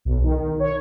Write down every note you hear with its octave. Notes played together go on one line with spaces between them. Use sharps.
B1
D#3
C#5